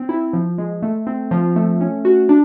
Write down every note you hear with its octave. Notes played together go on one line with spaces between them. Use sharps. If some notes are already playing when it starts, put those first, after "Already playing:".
Already playing: C4
E4
F3
G#3
A3
C4
F3
A3
C#4
F#4
D4